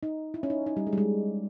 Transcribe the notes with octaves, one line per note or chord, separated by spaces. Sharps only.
D#4
E4
C#4
D#4
D#4
G3
G#3
G3
G#3